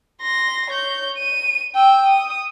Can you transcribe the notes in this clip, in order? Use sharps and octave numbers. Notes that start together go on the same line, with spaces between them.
C6 A#6
C#5 G6
D#7
G5 E6
D#6